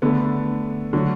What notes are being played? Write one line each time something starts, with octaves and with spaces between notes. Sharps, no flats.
D3 A3 B3
D3 F#3 A3 F#4